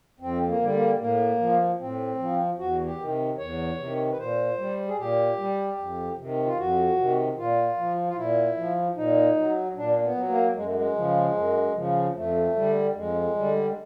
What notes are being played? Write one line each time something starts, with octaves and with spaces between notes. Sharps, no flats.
F2 C4
A#3
D3 G3
A#3
A2 A#3
F3
A2 C4
F3
E2 F#4
G4
C3 D#3
E2 C#5
C3 D#3
B4
A#2 C5
G3
G#4
A#2 G4
G3
F2
C3 D#3
F4
F2 F#4
C3 D#3
A#2 F4
F3
F4
A#2 E4
F3
A#2 D#4
F#3
A#2 D4
B3
F#3
A#3
F#2 G#3
A3
G#3
C#3 F3
F#2
C#3 F3
F2 A3
D3 G3
F2 G#3
D3 G3
G#3